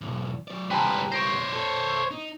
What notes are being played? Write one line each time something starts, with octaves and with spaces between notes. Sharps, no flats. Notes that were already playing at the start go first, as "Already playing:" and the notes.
B1 E2
F#3 D5
C#2 G3 G#3 B4 G5 A5 A#5
C5 C#5 A#6 D7
A4
D#4